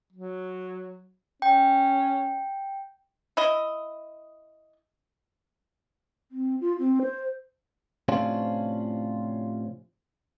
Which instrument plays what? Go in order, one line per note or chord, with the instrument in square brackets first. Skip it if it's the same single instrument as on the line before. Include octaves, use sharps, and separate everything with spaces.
[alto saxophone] F#3
[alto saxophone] C#4 [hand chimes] G5
[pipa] E4 D#5
[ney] C4
F4
C4
C5
[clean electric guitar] A2 C3 F3 C#4 D4 F4